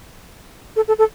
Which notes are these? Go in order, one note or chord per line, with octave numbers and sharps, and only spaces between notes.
A4
A4
A4